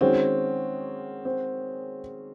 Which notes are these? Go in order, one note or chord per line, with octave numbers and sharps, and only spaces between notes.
D#3 G#3 C4 C#4 F#4
C4